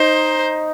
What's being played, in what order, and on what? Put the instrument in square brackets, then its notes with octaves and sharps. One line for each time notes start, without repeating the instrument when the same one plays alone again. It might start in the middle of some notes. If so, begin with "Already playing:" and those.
Already playing: [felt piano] D#4 [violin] C5